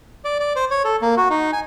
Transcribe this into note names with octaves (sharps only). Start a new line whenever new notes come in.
D5
D5
C5
C#5
A4
A#3
F#4
D#4
G#5